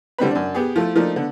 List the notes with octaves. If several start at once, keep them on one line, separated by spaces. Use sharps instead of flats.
D3 G3 C4 B4
F#2 D4
B3 G4 G#4
F3 A3 E4
F3 A3 A#3 D4 D#4
D3 B3